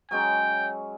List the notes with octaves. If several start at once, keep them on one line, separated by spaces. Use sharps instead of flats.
F#3 G#3 C#4 G5